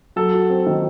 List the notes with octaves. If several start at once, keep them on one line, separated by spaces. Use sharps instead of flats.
F#3 A4
F#4
C4
D#3